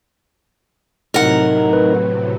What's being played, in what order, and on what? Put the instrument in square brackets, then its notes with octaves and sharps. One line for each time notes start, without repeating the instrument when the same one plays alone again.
[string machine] A2 C3 F#3 [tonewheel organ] D#4 [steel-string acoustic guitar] A#4 F#5
[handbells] B4